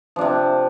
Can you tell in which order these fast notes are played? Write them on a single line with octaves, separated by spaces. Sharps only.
F3 D4 C3